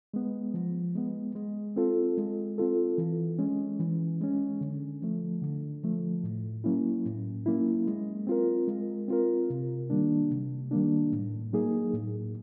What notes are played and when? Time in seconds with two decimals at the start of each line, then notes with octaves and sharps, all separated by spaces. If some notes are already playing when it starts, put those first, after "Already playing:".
0.14 G#3 B3
0.54 F3
0.95 G#3 B3
1.35 G#3
1.76 C4 F4 A4
2.17 G#3
2.58 C4 F4 A4
2.98 E3
3.38 G#3 C#4
3.79 E3
4.21 G#3 C#4
4.61 D3
5.02 F3 A3
5.42 D3
5.83 F3 A3
6.23 A2
6.64 F#3 A#3 C#4 E4
7.05 A2
7.46 F#3 A#3 C#4 E4
7.87 G#3
8.27 C4 F4 A#4
8.68 G#3
9.08 C4 F4 A#4
9.50 C3
9.90 D#3 G3 A#3 D4
10.30 C3
10.71 D#3 G3 A#3 D4
11.12 A2
11.53 F#3 A#3 D#4 G#4
11.93 A2